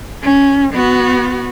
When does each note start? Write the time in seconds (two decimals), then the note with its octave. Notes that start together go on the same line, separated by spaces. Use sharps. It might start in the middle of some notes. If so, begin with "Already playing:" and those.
0.22 C#4
0.73 B3 F#4